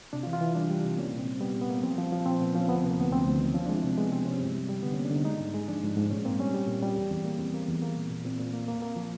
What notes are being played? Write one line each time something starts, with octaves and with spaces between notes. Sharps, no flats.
C3 D4
F4
E3
F4
E3 E4
G3 D4
G3
C3
A#3 C#4
A#2
C4
G3
G3 B3
A#2
B3
A#3
F3 C4
F3
F3
A#2 C4
A#2 B3
F3 C#4
D2 B3
C4
C3
A#3
D2 B3
D2 C4
D2
D#3
F3 C#4
D4
G#3
E4
C3 C4
G#3 B3
C3 C4
C3 C#4
G2
G3
G3
D3 B3
C#4
A#3
D4
D3 D#4
G#3 D#4
G#2
G#3
F3 D4
G#2
G#2
A#2 C#4
A#3 C4
G3 C#4
G3
A#2
G3
E2
E2
A#3
E2 C4
A#3
E2
A#3
A#2
A#2
A#2 C4
A#2
A#3
A#3
A#3
F3